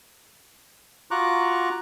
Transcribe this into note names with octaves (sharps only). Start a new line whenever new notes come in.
F4 F#4 A#5 C#6 D6 F#6